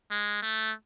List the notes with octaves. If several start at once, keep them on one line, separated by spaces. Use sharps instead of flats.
G#3
A3